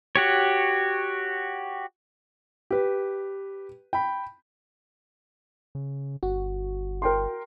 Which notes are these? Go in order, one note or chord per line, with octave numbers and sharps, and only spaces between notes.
F#4 G4 C#5
G4 B4
G5 B5
C#3
G1 F#4
A#4 G5 C6